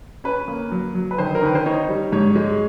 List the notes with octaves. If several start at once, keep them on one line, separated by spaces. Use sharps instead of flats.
C#4 B4
A#3
F#3
F#3
B4
D#3 C5
A#4
D#3 B4
C5
D#4 C#5
G3
G#2 C#5
G#3